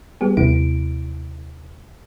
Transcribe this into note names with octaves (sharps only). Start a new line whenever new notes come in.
G3 B3 G4 G#4
D#2 C3 B3 E4 D7